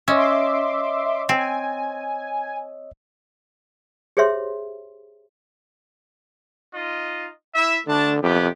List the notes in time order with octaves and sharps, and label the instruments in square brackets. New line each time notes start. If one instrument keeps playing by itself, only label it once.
[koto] C#4 [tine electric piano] C#5 D#5 E6 [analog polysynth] E5 C6 D6
[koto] C4 [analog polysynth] G#5
[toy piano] G4 G#4 C5 C#5 E5 C6
[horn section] D#4 F4 D#5
E4 E5
[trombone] D3 [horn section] A3 D4 A5
[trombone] F2 [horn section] C3 B3 G4